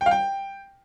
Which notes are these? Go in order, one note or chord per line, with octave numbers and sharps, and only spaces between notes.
G5
F5
G5